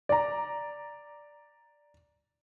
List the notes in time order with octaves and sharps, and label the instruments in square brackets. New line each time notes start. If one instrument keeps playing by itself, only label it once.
[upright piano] D5 A#5